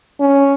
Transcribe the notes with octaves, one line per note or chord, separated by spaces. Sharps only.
C#4